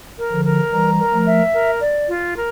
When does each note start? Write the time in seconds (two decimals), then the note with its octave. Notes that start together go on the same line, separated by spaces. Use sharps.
0.18 A#4
0.31 D3 F3
0.45 A#4
0.72 E3 G3 A#5
0.99 A#4
1.12 F3 A3
1.26 E5
1.53 A#4
1.81 D5
2.08 F4
2.35 A#4